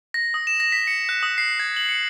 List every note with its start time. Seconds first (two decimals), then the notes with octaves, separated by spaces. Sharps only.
0.14 A#6
0.34 D#6
0.47 E7
0.60 A#6
0.72 B6
0.87 C#7
1.09 F#6
1.23 D#6
1.38 C7
1.60 G#6
1.76 F#7
1.89 C#7